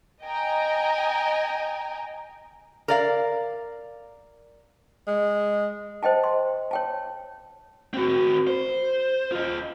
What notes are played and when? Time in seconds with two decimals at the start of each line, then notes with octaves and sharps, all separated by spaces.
0.23 D#5 G5 G#5 A#5
2.88 A#4 D5 F5
5.07 G#3
6.03 C5 D#5 G5 A5
6.24 C6
6.71 C#5 G5 A5
7.94 C4 F#4
8.47 C5
9.32 F4 D#5